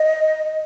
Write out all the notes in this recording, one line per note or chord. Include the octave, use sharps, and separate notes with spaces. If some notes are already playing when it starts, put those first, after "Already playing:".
Already playing: D#5